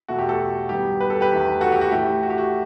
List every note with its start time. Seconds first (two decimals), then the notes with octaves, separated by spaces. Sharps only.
0.08 E2 B2 A3 F#4
0.19 G4
0.29 F#4 A4
0.39 F#4
0.69 G2 D#3 F#3 B3 G4
1.01 B4
1.10 A4
1.21 G4 B4
1.31 E2 D#3 A3
1.61 F#4 A4
1.72 G4
1.81 F#4
1.91 A2 E3 A3 G4
2.23 F#4
2.30 G4
2.38 F#4